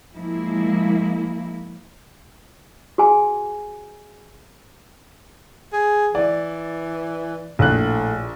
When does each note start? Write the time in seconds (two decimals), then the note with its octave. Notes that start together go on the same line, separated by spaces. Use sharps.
0.14 F3 G#3 A#3 E4
2.98 F#4 G#4 G#5
5.73 G#4
6.15 E3 D5
7.59 A#1 A2 F#6